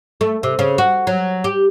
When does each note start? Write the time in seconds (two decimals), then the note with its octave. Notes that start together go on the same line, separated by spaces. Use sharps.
0.21 A3
0.43 C3
0.59 C#3
0.78 F#4
1.07 F#3
1.44 G4